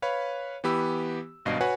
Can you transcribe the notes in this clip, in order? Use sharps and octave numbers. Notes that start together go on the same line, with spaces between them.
B4 C#5 F5 B5
E3 B3 G4 B5 E6
G#1 G2 B2 D#5 F5 C7
F#4 B4 C#5 F#5 G#5